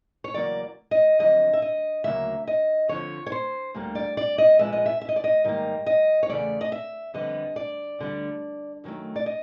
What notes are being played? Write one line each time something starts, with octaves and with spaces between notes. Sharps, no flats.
C#5
E2 C#3 F#3 A#3 D5
D#5
F2 D3 F#3 D#5
E5
D#5
D2 C#3 F#3 A#3 E5
D#5
F2 D3 F3 C#5
C#5
C5
D2 D3 G3 A#3
D5
D5
D#5
A#2 F3 G#3 B3 E5
D#5
E5
E5
D#5
D5
D#5
G#2 D#3 G3 A#3 D#5
D#5
C#5
E2 C#3 F#3 A3 D5
D#5
E5
F2 D3 G3 B3 D#5
D5
D2 D3 G3
F#2 D#3 F#3 A3
D5
D#5